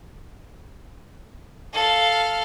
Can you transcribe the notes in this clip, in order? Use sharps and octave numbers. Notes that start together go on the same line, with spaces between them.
A4 F5